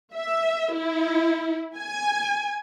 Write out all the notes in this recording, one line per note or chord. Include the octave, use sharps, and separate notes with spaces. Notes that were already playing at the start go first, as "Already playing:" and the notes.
E5
E4
G#5